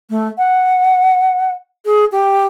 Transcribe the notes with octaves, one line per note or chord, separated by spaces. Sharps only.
A3
F#5
G#4
G4